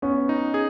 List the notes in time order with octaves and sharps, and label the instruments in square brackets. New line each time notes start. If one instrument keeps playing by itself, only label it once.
[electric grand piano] B3 [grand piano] C#4
[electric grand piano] D#4
G#4